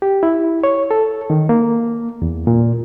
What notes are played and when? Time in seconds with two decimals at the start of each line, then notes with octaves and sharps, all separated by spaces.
0.02 G4
0.23 E4
0.64 C#5
0.91 A4
1.30 D#3
1.49 A#3
2.22 E2
2.47 A#2